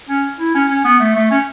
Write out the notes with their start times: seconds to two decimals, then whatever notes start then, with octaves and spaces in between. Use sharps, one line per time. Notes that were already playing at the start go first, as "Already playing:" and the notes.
0.08 C#4
0.39 E4
0.55 C#4
0.69 C#4
0.84 B3
1.00 A3
1.15 A3
1.31 C#4